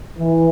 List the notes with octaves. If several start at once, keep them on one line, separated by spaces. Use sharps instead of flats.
E3